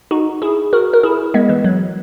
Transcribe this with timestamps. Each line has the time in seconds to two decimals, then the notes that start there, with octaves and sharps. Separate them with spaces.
0.11 D#4 F#4
0.42 E4 G#4
0.73 F#4 A#4
0.94 A#4
1.03 E4 G#4
1.34 G#3 B3
1.49 E3
1.64 F#3